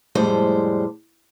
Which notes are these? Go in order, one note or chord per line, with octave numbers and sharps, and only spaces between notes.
F2 A2 G3 G#3 C5